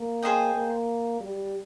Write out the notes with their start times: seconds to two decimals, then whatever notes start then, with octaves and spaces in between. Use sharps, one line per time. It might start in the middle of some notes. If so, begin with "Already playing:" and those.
Already playing: A#3
0.22 G#4 C5 D#5 G5
0.54 A#3
1.20 G3